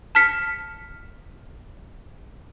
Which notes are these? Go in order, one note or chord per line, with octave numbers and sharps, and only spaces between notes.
A5 F6 B6 C#7